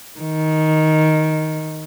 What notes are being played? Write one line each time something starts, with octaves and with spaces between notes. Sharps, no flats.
D#3